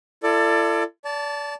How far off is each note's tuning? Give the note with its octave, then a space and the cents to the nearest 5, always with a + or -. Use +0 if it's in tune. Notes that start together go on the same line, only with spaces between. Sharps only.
E4 +45 A4 +20 D5 +15
D5 -30 A5 +0